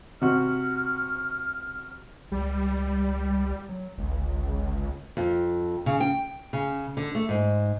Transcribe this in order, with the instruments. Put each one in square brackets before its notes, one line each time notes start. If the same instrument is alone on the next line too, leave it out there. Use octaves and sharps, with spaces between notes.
[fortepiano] C3 F#4 [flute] F6
[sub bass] C#2 [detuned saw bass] G3
[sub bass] F#3
[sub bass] G1 [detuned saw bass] C#2
[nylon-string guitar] F2
C#3
G5
C#3
D3
A3
G#2